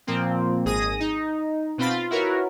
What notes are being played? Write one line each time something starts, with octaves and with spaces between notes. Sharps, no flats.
A#2 F3 A#3 C4
G#1 G#4 D#6 A#6
D#4
B2 C4 F4 B5 A6
F4
E4 F#4 A#4 B4 C#5